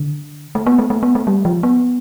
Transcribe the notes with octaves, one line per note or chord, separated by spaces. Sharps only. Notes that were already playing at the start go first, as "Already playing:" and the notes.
Already playing: D3
A3
B3
A3
A3
B3
A3
G3
F3
B3